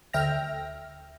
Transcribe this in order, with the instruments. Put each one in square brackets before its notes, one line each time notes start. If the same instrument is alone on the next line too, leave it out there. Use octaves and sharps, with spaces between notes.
[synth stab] D2 E5 G5 F6 A#6